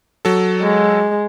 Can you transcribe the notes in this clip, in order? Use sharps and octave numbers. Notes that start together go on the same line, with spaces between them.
F#3 A4
G#3